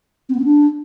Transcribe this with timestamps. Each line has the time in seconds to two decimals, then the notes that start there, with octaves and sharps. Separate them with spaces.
0.29 C4
0.34 B3
0.39 C#4
0.44 D4